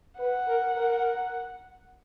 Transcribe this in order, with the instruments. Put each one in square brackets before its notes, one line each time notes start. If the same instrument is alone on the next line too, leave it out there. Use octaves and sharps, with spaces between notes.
[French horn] B4 [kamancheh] F#5
[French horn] A#4
A#4